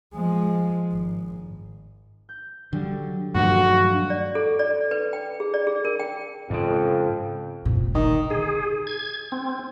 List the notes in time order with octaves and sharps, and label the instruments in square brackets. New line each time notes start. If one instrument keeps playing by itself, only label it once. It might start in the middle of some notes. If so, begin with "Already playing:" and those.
[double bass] F3 G#3
G#1
[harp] G6
[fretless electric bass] D3 [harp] F#3 G3
[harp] D#1 F3 D4 [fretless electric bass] G2 A3 [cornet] F#4
[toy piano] D5
A4
D5
B4
G5
G#4
D5
G#4
A#4
G5
[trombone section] F2 [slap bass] G#2 C#3
[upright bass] F1 A#2
[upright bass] A#2 D3 [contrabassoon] D#3
[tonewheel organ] G#4
G#6
C4